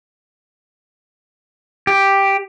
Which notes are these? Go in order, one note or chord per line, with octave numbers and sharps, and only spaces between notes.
G4